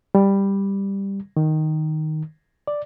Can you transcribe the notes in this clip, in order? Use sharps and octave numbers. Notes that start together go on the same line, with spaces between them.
G3
D#3
D5